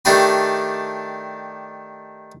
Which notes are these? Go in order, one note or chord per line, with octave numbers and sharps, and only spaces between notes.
D#3 A3 D4 G4 G#5 B5